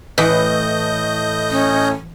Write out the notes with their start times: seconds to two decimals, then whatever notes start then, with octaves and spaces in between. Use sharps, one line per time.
0.18 A2 E3 D#5 D#6 G6
1.51 C#4